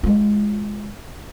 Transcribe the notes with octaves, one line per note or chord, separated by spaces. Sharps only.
G#3 F4